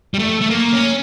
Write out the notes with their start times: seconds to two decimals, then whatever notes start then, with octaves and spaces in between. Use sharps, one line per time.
0.14 G3
0.19 A3
0.41 A3
0.50 A#3
0.72 C#4